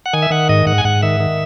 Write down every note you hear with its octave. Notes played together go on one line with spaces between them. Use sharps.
F#5
D#3 G#5
E5
D#3 F#5
G#2 D#5
G#2 F#5
G#5
G#2 F#5
D#3 E5
D#3